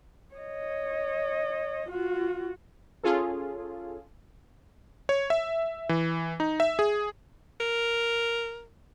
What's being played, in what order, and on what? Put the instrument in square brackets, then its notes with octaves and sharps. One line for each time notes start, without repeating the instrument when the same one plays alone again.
[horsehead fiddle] C#5 D#5
F4 F#4
[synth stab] C#4 F4 G#4 A4
[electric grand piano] C#5
E5
E3
D#4
E5
G#4
[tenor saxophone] A#4